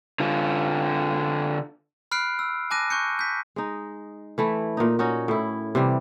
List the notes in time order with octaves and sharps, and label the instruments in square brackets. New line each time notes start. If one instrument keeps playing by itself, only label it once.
[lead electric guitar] D3 F4
[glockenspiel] B5 F6 F#6 C7 D7
E6
G#5 A5 D6 F#6 A#6 D#7
C#6 F#6 G6 C#7
G6 B6
[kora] G#3 D#4
E3 A3 E4
A#2 D#4
C#4 D#4 F#4
A2 E4
C3 E3 G3